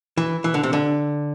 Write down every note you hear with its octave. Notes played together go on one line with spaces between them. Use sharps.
E3
E3
D3
C3
D3